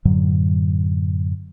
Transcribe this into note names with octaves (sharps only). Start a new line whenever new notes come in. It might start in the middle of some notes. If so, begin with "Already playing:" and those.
F#2 A2 D3 F#3